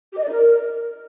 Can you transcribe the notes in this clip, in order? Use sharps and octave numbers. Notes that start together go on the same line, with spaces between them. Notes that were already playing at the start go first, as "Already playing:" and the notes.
G4
D#5
D5
D#4
A#4